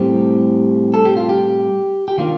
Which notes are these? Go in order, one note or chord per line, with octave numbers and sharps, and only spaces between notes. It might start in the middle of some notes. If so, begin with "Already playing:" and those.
Already playing: A2 G3 C4 G4
A4
G4
F4
G4
G4
D#3 A#3 D4 F4